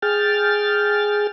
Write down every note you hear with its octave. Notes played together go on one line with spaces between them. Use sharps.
G#4 G5 F6 A6